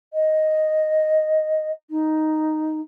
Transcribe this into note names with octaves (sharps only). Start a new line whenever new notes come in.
D#5
D#4